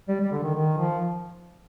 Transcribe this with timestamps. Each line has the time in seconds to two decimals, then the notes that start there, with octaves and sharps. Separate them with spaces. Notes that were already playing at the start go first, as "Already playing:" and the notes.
0.08 G3
0.20 G3
0.32 D3
0.43 D#3
0.54 D#3
0.77 F3